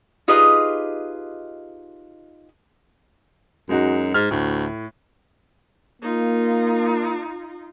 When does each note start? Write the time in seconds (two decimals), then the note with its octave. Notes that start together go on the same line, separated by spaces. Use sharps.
0.28 D#4 F4 G4 G#4 B4 D#5
3.69 F#2 G#3 D#4 F#4
4.14 G#2 F6
4.31 D2 A2
6.02 A#3 D#4 F4